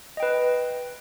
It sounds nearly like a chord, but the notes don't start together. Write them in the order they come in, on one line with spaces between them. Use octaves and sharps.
D#5 G5 B4